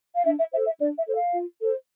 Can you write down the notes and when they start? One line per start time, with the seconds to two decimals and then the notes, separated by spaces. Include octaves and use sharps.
0.15 F5
0.25 D4 E5
0.38 E5
0.52 A4 C5 E5
0.65 E5
0.79 D4 D5
0.97 E5
1.06 A4 C5
1.15 F5
1.33 F4
1.60 A4 C5